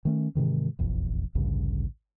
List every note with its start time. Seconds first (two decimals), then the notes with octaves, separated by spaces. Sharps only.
0.05 D#3 A3 C#4
0.35 G#2 C3 D#3 E3
0.79 F1 A#1 E2
1.35 A1 D2 G2 C#3